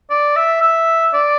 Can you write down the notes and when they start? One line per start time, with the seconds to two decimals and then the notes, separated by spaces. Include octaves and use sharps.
0.10 D5
0.36 E5
0.62 E5
1.14 D5